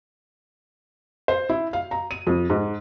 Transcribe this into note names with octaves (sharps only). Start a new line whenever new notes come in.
C5
E4
F5
A#5
D#7
F2
G#2